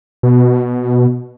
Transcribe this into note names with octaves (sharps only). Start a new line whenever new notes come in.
B2